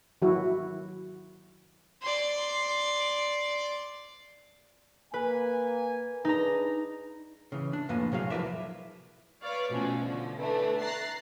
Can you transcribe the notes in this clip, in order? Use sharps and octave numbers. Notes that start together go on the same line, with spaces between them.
D#3 F#3 E4 F#4
D5 C6
A#3 B4 G#5
D4 D#4 G#4 B4 A#5
C#3 E3
D4
F2 A2 A#3 B4 G#5
C2 F#3 G#4 F5
F3 E4 A#4 B4 D5 E5
B4 C#5 D5 F5
B2 F3 A3 C#4 F#4
D3 F3
E3 A3 D4
A#5 F#6 A6 C7